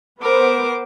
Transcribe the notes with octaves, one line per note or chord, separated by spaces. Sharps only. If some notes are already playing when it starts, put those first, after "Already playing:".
B3 A#4 C5 D6